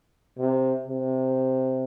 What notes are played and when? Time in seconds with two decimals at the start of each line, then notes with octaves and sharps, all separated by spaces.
0.38 C3
0.88 C3